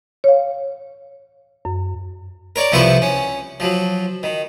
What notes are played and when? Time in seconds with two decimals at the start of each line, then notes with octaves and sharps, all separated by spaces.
0.24 C#5 F5
1.65 F#2
2.56 A#4 C#5 D5
2.72 C2 F3 B3 E4 C5 C#6
3.02 C#4
3.60 F3 F#3
4.23 D#3